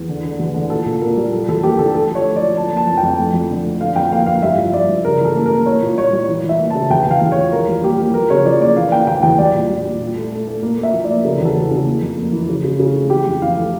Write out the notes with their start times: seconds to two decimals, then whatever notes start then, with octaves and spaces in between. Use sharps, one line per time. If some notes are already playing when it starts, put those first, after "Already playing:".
Already playing: E2
0.09 D3
0.24 D3
0.39 E2
0.54 D3
0.70 A#2 A4
0.86 A#2
1.01 A#2 A#4
1.16 G3
1.33 F3 A4
1.48 E2 A4
1.63 A#3 G4
1.79 D3 A4
1.94 A3 A4
2.10 F3 C#5
2.25 A3
2.36 D5
2.42 F3
2.56 F3 A5
2.72 A#3 A5
2.87 F2
2.97 G5
3.03 F2
3.19 A3
3.34 F2
3.50 D3
3.66 A3
3.81 D3 F5
3.96 F2 G5
4.12 A#3 F5
4.26 A#3 F5
4.42 G2 E5
4.58 F3
4.73 G2 D5
4.89 G2
5.05 C#3 A#4
5.20 E3 A4
5.35 A#3
5.46 A#4
5.51 A#3
5.66 A#3 C#5
5.82 A#2
5.98 G3 C#5
6.13 G3
6.28 E3
6.44 E3 E5
6.59 A#3
6.70 C#3 A5
6.90 E2 G5
7.06 E2 F5
7.22 E2
7.32 C#5
7.37 F3
7.52 E2 A#4
7.68 G3
7.83 A#3 G4
7.99 A#3
8.14 F3 A#4
8.30 C#3 C#5
8.45 F3 D5
8.61 A#3 D5
8.76 E3 F5
8.92 A#3 G5
9.07 E2 G5
9.23 E2 G5
9.38 G3 D5
9.54 A#2
9.69 G3
9.85 A#2
10.00 A#2
10.16 A3
10.32 A3
10.47 A3
10.62 A#3
10.78 A#3 E5
10.93 F3
11.04 D5
11.10 A#3
11.24 C#3 A#4
11.41 E2 A4
11.55 C#3
11.71 C#3
11.86 A#3
12.02 F2
12.17 A#3
12.32 E3
12.49 C#3
12.64 C#3
12.79 C#3
12.95 A3
13.10 E3 G4
13.27 F2
13.42 E3 F5
13.56 A3